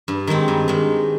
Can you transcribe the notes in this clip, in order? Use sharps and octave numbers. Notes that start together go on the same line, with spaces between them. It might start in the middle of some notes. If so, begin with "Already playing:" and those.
G2
D#3 G#3 C4
G2
D#3 G#3